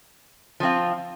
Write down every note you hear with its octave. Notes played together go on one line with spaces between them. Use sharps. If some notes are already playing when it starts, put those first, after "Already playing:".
F3 C4 F4